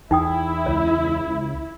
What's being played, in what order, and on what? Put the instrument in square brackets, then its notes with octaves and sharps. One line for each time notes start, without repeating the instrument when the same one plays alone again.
[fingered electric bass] E2 [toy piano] D#4 G5 D#6 [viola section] E4
[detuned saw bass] C#2 [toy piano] C#5